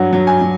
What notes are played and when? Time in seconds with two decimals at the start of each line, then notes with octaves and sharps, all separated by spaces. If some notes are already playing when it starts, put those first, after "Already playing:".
Already playing: G2 F#3 F#5
0.13 F#3
0.27 G#5
0.41 F#3